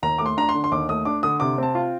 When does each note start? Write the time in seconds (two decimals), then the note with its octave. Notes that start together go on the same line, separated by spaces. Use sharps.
0.03 D#2 A#5
0.18 A3 D6
0.26 C6
0.37 D4 A#5
0.49 C6
0.55 D3
0.64 C6
0.72 D#2 D6
0.89 A3 D#6
1.05 D4 D6
1.23 D3 D#6
1.40 C3 D6
1.58 C4 A5
1.75 F4